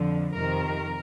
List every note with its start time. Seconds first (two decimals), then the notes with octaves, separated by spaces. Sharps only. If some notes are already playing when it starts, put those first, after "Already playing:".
Already playing: F2 D3 F3
0.35 F2 C3 D#3 A#4